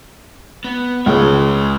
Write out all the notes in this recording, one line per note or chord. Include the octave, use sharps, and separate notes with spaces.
B3
C#2 G#3 G#4 C#5